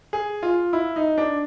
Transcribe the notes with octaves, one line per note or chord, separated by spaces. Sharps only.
G#4
F4
E4
D#4
D4